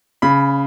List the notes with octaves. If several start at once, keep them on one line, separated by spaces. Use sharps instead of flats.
C#3 B5